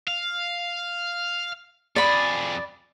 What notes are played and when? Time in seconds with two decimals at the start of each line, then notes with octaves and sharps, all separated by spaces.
0.08 F5
1.96 F2 G#4 D5 B5